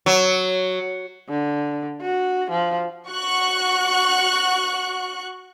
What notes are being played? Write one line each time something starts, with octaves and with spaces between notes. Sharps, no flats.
F#3
D3
F#4
F3
F#4 C#6 F#6